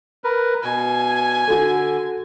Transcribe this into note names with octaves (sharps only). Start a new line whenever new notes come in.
A#4 B4
B2 G#5
D3 F#4 A4